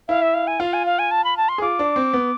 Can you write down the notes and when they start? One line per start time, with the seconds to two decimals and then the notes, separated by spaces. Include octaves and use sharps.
0.08 E4 F5
0.22 E5
0.34 F5
0.47 G#5
0.60 F4 F5
0.73 G#5
0.86 F5
0.99 G#5
1.11 A5
1.24 B5
1.37 A5
1.49 C6
1.58 G#4
1.62 F4 D6
1.79 D4
1.96 C4
2.13 B3